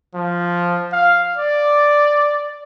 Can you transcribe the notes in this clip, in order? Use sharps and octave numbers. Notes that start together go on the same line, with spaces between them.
F3
F5
D5